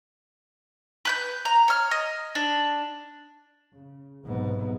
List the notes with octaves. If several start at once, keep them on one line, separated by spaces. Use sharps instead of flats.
B4 F#6 G6
A#5
C#5 F6
D#5
D4
C#3
B1 G#2 C3 B3